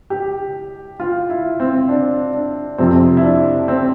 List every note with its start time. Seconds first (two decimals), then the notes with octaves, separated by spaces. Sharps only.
0.10 G4
1.00 F4
1.30 E4
1.60 C4
1.89 D4
2.33 D4
2.78 F2 C3 F3 C4
3.17 E4
3.23 D4
3.68 C4